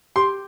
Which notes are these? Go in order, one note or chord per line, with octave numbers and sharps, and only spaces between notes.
G4 C6